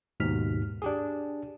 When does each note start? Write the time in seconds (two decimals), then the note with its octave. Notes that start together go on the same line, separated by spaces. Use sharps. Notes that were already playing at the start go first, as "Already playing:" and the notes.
0.20 D#2 G#2 B2 F6 B6
0.82 D4 G4 G#4